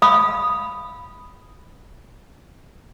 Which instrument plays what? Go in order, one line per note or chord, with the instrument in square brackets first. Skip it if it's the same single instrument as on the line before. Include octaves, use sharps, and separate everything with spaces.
[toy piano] F5 B5 D#6